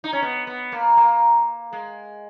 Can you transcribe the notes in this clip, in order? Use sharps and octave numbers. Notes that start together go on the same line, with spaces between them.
D#4
C#4
B3
B3
A#3
A#3
G#3